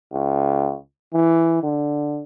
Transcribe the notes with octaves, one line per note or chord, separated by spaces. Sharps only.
C#2
E3
D3